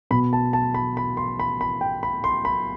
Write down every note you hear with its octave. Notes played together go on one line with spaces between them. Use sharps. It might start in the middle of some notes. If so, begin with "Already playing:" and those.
B2 B5
A5
A5
B5
B5
C6
B5
B5
G5
B5
C6
B5